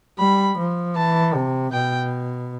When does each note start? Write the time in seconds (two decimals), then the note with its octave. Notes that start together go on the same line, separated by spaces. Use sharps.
0.19 G3 B5
0.58 F3
0.96 E3 A5
1.35 C3
1.73 B2 G5